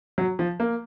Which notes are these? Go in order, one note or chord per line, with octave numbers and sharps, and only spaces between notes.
F#3
F3
A#3